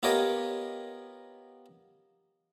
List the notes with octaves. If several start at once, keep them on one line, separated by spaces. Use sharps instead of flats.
B3 F4 G4 A#4 C#5 D#5